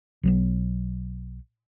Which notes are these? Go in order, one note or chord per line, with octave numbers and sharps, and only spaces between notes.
B1 F#3 B3